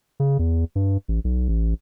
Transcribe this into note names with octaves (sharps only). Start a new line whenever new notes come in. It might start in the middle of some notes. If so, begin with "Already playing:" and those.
C#3
E2
G2
A1
B1
A1